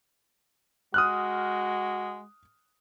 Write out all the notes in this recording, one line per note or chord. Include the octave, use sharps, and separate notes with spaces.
G#3 F#4 D#6 F6 F#6